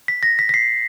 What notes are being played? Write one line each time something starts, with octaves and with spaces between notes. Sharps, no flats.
B6
A#6
B6
B6
C7